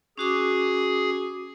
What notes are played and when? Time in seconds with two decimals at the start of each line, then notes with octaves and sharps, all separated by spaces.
0.18 C#4 F#4 G#4 D6